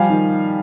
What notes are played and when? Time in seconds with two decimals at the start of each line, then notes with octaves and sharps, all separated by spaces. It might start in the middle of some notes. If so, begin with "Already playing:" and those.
Already playing: F3 G3 F5 G#5
0.10 D#3